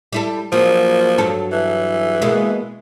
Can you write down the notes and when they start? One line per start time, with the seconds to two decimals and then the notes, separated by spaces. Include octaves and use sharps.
0.13 G3 E4 A4
0.52 F3 F#3 A#3
1.18 G2 F#3 A4
1.52 E3
2.22 B2 G#3 A#3